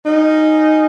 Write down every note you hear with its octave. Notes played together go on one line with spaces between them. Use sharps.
F#3 C#4 D#4 G#4 D#5